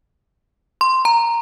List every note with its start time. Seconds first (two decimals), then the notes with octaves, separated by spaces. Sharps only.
0.81 C6
1.05 A#5